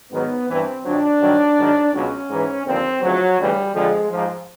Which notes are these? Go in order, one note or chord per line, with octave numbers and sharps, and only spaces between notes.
G#2 D#3 F#3 B3
G2 E3 C4
F2 D3 F#3 D4
G2 D#3 F#3
G#2 D#3 F#3
C#2 B2 F#3 C#4
G#2 E3
D#2 D3 F3 C4
D2 C#3 F3 F#3
D2 C#3 E3 G3
F2 D3 F3 G#3
G#2 F3